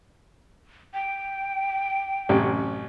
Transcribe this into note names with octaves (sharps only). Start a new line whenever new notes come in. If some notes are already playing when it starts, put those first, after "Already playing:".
G5
A1 F#2 C3